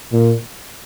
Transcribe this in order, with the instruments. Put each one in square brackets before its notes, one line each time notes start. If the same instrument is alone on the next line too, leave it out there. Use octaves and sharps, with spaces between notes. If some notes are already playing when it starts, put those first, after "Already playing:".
[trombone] A#2